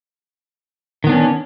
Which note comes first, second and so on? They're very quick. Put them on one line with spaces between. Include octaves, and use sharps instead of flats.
D#3 B3 D4 C#4